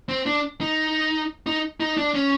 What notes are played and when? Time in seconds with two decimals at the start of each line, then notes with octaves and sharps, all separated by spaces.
0.09 C4
0.26 D4
0.61 D#4
1.47 D#4
1.80 D#4
1.97 D4
2.15 C#4